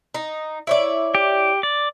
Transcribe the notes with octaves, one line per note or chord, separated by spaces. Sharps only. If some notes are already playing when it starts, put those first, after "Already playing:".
D#4
E4 C#5 D5
G4
D5